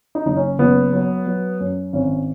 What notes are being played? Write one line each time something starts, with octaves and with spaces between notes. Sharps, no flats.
D#4
F#1 D#4
C#4
F#1 B3
F#3
F#3
F#2
G#1 C#4